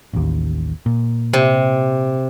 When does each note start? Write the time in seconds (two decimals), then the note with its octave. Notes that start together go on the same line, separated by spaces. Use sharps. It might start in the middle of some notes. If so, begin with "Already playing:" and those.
0.13 A1 D#2
0.86 A#2
1.33 C3